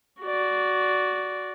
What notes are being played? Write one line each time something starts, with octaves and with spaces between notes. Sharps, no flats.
F#4 D5